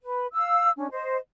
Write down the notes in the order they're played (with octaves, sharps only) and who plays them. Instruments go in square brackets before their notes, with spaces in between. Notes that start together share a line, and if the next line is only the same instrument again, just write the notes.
[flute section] B4
F5 E6
C#4 D4
C5 D#5